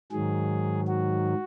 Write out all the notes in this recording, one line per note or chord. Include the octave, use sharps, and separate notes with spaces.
G#2 D#3 F#3 G#4
F#4